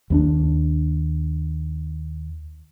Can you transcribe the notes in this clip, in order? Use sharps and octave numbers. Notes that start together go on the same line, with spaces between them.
D#2 B3 D4